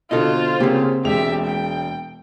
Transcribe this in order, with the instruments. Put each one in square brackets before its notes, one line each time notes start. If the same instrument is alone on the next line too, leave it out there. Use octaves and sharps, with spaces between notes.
[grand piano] B2 D3 [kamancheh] F4 C5 [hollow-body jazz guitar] A4 D#5
[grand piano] C#3 G4 G#4 [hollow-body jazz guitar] A#3 C4
[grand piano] E1 G#3 F7 [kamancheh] G4 E5
[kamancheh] G5